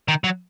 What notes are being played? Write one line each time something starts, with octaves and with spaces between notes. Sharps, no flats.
D#3
F#3